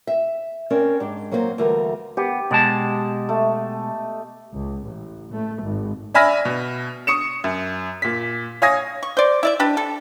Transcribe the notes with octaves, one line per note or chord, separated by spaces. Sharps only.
E5
C4 C#4 A#4 D5
G#2 D4 G4
F#3 A#3 C4 B4 C5
D2 E3 G3 A#4
B3 G4
B2 G#3 D#5 A5
A3
C#2
A1
A3
G#1
D5 E5 G#5 B5 F6 A#6
B2
C#6 D#6 C#7 E7
F#2
A#2 B6
C#5 F5 G#5 D#6 G#6 A#6
C#6
C5 D5
E4 D5 E5
D4 G4 B4
A4